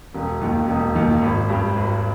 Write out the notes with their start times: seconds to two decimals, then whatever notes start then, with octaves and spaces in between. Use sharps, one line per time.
0.14 E1
0.41 D#2 D#3
0.68 E1
0.95 D#2 D#3
1.22 G#1
1.49 G2 G3
1.76 G#1